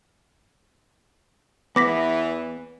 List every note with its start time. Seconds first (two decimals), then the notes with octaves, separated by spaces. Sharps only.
1.76 E2 E3 B3 D6 A#6 B6